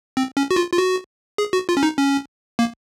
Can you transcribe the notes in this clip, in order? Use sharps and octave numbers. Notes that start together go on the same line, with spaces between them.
C4
C#4
F#4
F4
F4
F#4
G#4
F#4
F4
C#4
D#4
C#4
A#3